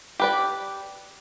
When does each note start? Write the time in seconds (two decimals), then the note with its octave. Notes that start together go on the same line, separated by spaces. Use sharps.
0.19 G4 B4 D5